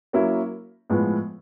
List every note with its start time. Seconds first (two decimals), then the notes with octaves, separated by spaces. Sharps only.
0.13 F#3 A#3 C#4 E4
0.90 A2 F3 G#3 B3